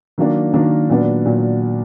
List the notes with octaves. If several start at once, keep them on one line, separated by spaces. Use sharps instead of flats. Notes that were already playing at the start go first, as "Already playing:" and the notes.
D#3 F#3 A#3 D4
D#3 F#3 A#3 D4
A#2 F#3 B3 D4
A#2 F#3